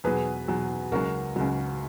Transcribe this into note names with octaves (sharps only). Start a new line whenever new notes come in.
E2 B2 F#3 G#4 B4
E2 B2 F#3
C#2 C#3 F#3 F#4 A#4
C#2 C#3 F#3